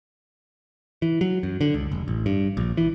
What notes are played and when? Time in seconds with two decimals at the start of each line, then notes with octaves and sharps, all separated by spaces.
1.02 E3
1.21 F#3
1.43 F#2
1.61 D3
1.74 C#2
1.92 F1
2.08 A1
2.26 G2
2.57 A#1
2.77 E3